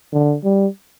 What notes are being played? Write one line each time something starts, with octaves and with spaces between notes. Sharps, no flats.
D3
G3